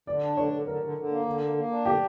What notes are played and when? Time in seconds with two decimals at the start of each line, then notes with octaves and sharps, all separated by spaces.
0.07 D3 D5
0.23 D4
0.37 D3 C#5
0.52 D3
0.67 D3 A#4
0.83 D3
0.97 D3
1.12 A#3
1.26 D3
1.41 A#3
1.56 A#3
1.71 D4
1.86 D3 G4